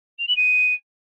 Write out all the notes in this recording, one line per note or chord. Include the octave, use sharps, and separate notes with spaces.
F7
F#7
D#7